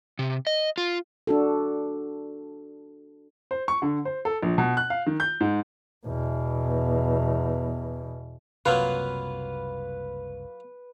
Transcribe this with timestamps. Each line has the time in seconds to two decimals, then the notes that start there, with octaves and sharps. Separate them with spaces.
0.19 C3
0.47 D#5
0.78 F4
1.27 D4 F#4 A4
3.51 C5
3.68 C#6
3.82 D3
4.05 C5
4.25 A4
4.43 A#1
4.58 B2
4.77 F#6
4.90 F5
5.07 D#3
5.20 G6
5.41 G#2
6.06 E2 B2
8.66 F#1 C2 C3 F#3 A#3 F4 B4